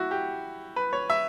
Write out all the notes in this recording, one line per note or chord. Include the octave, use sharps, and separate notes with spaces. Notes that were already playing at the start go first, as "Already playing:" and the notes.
Already playing: E4 F#4
G4
B4
C#5
E5